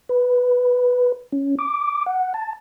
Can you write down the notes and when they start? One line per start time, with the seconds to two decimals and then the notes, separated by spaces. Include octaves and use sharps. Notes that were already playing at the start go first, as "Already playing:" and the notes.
0.09 B4
1.32 C#4
1.59 D6
2.06 F#5
2.34 A5